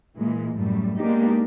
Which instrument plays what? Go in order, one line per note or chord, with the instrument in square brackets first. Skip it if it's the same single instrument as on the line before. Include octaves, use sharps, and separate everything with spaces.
[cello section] A#2 E3 G#3
F#2 A2 G3 A3
G#3 A#3 B3 D4 D#4 G4